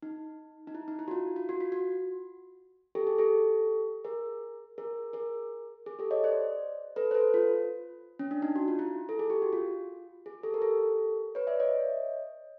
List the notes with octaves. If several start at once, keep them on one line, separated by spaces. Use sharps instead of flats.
D#4
D#4
E4
D#4
E4
F#4
F4
F4
F#4
F4
F#4
G4 A4
G#4
G4 A4
G#4 A#4
G#4 A#4
G#4 A#4
G#4
G4 A4
C#5 D#5
C5 D5
A4 B4
C5
A4 B4
F4
C#4
D4
D#4
F#4
F4
E4
A4
G#4
G4
F#4
F4
G#4
G4 A4
A#4
G4 A4
B4 C#5
D5 E5
C#5 D#5